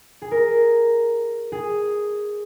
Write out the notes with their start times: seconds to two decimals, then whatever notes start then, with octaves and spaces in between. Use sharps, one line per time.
0.22 G#4
0.31 A#4
1.52 G#4